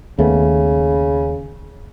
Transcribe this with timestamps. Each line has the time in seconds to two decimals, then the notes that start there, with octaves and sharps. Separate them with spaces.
0.19 D#2 C#3 A3 B3